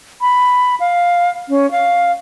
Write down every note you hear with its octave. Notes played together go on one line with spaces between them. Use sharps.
B5
F5
C#4
F5